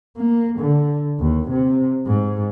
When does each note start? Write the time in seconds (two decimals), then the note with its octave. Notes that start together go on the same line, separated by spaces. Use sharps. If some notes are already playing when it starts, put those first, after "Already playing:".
0.17 A#3
0.60 D3
1.20 D#2
1.51 C3
2.06 G#2